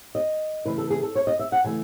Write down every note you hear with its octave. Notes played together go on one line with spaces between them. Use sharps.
D#5
C#3 E3 A3 E4 B4
A4
G#4
A4
C#5
D#5
E5
F#5
C#3 E3 A3 E4 G#5